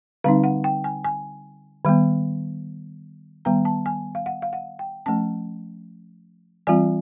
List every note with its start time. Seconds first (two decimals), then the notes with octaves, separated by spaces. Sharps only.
0.24 D3 G3 C4 D#4 F5
0.44 F#5
0.64 G5
0.84 G#5
1.05 G#5
1.85 D#3 G3 B3
3.45 D#3 G3 B3 A#5
3.65 A5
3.86 G#5
4.15 F5
4.26 F#5
4.42 F5
4.53 F#5
4.79 G5
5.06 F3 A3 C#4 A5
6.67 E3 G3 C4 F4 G#5